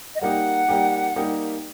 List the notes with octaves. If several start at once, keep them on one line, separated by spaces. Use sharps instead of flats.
D#5
G3 A#3 D#4 G4 F#5
G3 A#3 D#4 G4
G3 A#3 D#4 G4